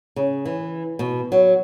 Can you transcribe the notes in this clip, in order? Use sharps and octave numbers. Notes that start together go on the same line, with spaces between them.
C#3
E3
B2
F#3